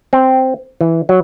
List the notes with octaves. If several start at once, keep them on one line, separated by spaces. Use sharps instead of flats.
C4
E3
F#3